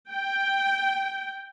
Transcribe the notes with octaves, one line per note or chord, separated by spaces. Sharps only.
G5